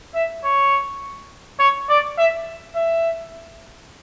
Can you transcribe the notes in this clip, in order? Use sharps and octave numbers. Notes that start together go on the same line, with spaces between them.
E5
C#5
C#5
D5
E5
E5